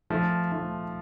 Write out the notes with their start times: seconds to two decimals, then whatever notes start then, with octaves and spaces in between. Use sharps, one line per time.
0.10 F3 A3
0.52 F3 A3